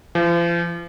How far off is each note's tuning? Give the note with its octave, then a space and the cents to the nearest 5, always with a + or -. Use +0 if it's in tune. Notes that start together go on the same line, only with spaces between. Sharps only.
F3 -40